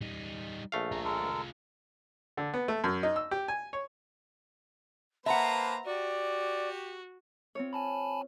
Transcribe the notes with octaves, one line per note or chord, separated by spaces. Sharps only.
G3 D#4
A#1 A3 F5
F4 G#4 A#5
G#3 A4 A#4
D3
B3
A3
F#2
D#4
E6
G4
G#5
C#5
A#3 B4 C5 E5 F#5 A5 A#5
F#4 G4 D5
C4 F4 C#5
G#5 A5 B5